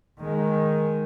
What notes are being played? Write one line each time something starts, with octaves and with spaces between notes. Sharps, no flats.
D#3 G#3